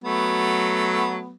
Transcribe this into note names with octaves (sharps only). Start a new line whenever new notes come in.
F#3 A3 B3